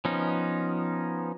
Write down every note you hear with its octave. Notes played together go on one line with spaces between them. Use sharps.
F3 B3 C#4 D#4